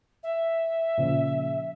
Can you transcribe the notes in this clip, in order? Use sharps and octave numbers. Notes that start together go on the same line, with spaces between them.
E5
A#2 C#3 F3